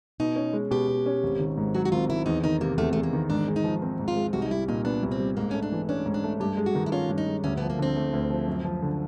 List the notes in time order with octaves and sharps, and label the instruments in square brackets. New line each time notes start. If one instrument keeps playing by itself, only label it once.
[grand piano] B2 [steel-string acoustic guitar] D#4
[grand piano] C#4
G#3
[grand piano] B2 [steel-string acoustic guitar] G4
[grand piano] B2
C#4
G#1
D#3
G#2
[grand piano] F#3 [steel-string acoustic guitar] F#4
[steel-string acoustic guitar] F#4
[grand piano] G#1 [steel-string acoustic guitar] F4
[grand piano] D#3 [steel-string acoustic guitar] E4
[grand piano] E2 [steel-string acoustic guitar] D#4
[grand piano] D#3 [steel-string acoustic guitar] D#4
[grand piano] C3 [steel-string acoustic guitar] A#3
[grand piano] E2 [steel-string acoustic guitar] A3
[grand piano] E2 [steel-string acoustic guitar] A3
[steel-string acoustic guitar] A#3
[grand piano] D#3
[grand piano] G#2 [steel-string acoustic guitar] D4
[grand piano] G#3
[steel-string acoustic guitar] D#4
[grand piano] F3
C4
G#2
[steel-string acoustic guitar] F4
[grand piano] G#3
[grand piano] C2 [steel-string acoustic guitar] F#4
[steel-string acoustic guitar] D#4
[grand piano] G3 [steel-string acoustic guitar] E4
[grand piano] A#2 [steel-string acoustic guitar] D#4
[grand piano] B3 [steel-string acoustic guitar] D4
[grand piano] C2
[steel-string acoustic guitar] C4
[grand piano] G3
[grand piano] G#2 [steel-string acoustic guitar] A#3
[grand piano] A3 [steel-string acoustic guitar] C#4
[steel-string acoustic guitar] D4
[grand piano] E3
[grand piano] C#4 [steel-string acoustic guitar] D4
[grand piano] G#2
[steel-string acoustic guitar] D4
[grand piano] A3
[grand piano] G2 [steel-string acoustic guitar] G4
[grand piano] G#3
[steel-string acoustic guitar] F#4
[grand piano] D#3
[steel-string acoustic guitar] E4
[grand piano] C#4 [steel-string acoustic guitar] F4
[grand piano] G2
[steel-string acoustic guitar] D#4
[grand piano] G#3
[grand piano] D2 [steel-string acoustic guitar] C#4
[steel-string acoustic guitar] B3
[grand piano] F3
[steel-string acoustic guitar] A#3
[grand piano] D3 [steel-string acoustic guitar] C4
[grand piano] A3
D2
F3
F#2
F3
D3